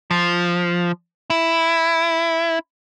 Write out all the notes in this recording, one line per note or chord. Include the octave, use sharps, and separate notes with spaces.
F3
E4